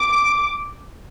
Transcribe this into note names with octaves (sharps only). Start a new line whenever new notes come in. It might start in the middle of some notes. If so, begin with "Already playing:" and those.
Already playing: D6